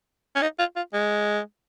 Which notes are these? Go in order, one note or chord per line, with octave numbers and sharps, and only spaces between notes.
C#4
D#4
F4
F4
G#3